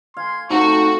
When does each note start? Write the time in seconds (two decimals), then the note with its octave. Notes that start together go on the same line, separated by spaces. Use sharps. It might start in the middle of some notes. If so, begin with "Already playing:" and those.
0.17 F5 G#5 C6 G#6
0.50 C3 A3 D#4 F#4 C#6